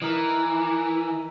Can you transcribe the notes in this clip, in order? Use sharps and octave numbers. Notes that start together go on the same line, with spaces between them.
E3 D#4 A#4 D#5